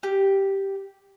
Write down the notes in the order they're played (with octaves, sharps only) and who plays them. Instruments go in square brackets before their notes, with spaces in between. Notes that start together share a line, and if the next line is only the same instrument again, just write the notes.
[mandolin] G4